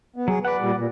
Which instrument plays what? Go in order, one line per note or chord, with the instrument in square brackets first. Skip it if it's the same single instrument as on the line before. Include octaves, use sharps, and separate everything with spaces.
[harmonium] B3
[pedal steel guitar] F#3 [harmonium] G#4
[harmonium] B4 [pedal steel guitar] D5 F#5
[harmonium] A#2 G3
A#2